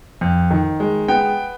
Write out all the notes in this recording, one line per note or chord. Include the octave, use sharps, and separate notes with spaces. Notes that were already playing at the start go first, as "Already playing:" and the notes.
F2
D#3
G#3
B3 G5